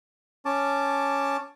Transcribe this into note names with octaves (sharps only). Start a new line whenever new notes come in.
C#4 A5 D6